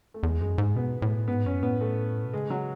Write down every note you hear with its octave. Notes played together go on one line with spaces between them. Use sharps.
A3
E2 G#3
F#2 G#3
G#2 G#3
B2 B3
A2
G#2 B3
F#2 C#4
A2 B3
A3
B2
C#3 G#3
F#3